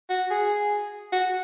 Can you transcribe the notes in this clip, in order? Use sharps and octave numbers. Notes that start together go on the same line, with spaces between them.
F#4
G#4
F#4